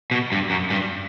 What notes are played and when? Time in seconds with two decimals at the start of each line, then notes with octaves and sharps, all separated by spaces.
0.11 B2
0.32 G2
0.50 F#2
0.70 G2